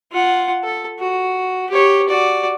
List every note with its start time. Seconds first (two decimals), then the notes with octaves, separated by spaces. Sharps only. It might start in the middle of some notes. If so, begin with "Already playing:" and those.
0.11 F4 F#5
0.64 A4
0.99 F#4
1.69 G4 C#5
2.08 F#4 D5